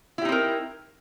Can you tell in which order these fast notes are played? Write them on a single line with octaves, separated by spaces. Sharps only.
E4 G4 D#4 C4 A#4